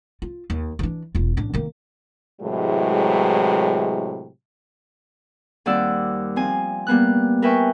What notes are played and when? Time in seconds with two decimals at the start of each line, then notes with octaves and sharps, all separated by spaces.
0.22 F4
0.50 D#2
0.79 E3 D4
1.15 E1 F4
1.37 A1 D4
1.53 D#3 A#3
2.41 A2 C3 E3 F#3 G#3
5.66 D#2 G3 C4 D5 F#5 E6
6.36 F3 C4 G#5
6.87 G3 A#3 B3 F#6
7.42 A#4 B4 E5 G5 G#5 C#6